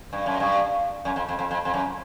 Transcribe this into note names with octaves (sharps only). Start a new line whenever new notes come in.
G2
F#2
G2
F#2
F2
F2
F2
F2
F2
F#2